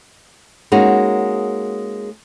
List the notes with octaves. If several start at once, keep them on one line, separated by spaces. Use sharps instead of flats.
G#3 A#3 C#4 D#4 F#4 G#4